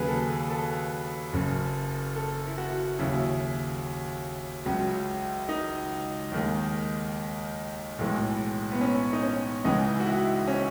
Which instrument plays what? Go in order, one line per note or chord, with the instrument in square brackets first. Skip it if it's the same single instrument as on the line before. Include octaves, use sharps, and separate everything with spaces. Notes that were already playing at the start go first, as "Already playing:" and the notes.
Already playing: [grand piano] D#2 C#3 F#3 G#4 B4
A4
A4
F#1 F#2 C#3
A4
E4
F#4
D#2 C#3 F#3 E4
C#2 C#3 F#3
D#4
D#2 D#3 G#3
B1 A2 E3 G#3
B3
C#4
D#4
C#4
C#2 C#3 E3 G#3 D#4
F#4
E4
C#4